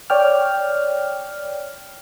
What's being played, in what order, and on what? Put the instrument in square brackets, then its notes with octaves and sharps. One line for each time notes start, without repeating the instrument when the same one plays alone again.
[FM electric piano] C#5 D5 G5 F6